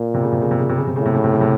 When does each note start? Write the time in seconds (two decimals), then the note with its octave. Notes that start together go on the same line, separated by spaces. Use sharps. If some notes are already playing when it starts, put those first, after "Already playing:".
Already playing: A#2
0.14 C3
0.23 C#3
0.33 C3
0.42 C#3
0.51 C3
0.59 C#3
0.69 C3
0.78 C#3
0.87 C3
0.96 C#3
1.01 A2
1.06 C3
1.14 C#3
1.24 C3
1.33 C#3
1.41 C3